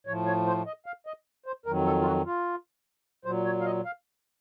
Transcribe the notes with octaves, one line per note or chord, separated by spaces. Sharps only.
A2 F3 C#5
C#5
C5
D#5
F5
D#5
C5
F2 D#3 F#3 A#4
A4
F4
F#4
F4
A#2 F#3 C5
C#5
F5
D#5
F5